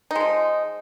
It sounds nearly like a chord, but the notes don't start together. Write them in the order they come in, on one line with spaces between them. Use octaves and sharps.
D#4 G#3 F3